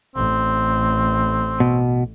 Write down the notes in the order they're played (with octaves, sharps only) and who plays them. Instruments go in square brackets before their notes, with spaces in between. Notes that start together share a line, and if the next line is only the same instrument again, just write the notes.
[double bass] A1 [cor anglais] C4
[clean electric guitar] B2